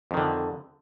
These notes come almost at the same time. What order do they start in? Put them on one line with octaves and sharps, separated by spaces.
F2 D#3 D3